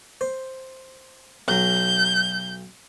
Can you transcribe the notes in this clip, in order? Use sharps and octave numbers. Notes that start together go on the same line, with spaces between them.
C5
B1 F#3 G6